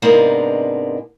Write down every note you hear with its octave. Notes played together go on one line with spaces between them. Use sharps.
G#2 C3 G#3 A#3 B3 D4